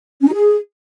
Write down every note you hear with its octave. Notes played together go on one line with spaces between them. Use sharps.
C#4
D#4
G#4